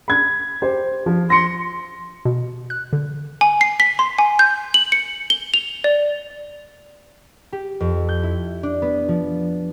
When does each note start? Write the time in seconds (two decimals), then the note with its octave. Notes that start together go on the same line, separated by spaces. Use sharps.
0.08 B5 G#6
0.62 G4 C5
1.06 F3
1.30 C6 A#6 C#7
2.25 B2
2.70 F#6
2.93 D3
3.41 G#5
3.61 C7
3.80 B6
3.99 C6
4.18 G#5
4.39 G6
4.74 F#7
4.92 C#7
5.30 G7
5.54 F7
5.84 D5
7.52 G4
7.80 F2
8.09 G6
8.23 E4
8.63 D4
8.82 B3
9.08 F3